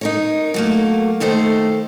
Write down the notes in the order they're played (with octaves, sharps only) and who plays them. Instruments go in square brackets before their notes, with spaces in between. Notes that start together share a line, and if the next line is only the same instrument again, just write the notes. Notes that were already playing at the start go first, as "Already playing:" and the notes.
[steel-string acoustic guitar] D#4 A#4 C#5
F#3 A3 A#3
D#2 D#3 A3 A4 C5